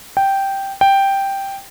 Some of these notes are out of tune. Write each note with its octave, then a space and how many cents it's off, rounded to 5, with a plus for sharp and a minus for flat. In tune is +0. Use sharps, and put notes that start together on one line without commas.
G5 -5
G5 +0